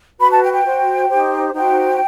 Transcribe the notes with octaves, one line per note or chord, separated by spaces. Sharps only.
F#4 B4 B5
A5
G5
G5
F#4 C5
D#4 G4 C5
D#4 F#4 C5 G5